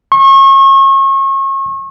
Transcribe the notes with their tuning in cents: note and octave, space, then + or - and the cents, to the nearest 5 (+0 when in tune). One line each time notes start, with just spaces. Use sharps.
C#6 -35